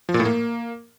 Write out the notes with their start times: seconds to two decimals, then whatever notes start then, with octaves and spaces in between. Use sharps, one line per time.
0.09 F3
0.14 A#2
0.20 A2
0.25 A#3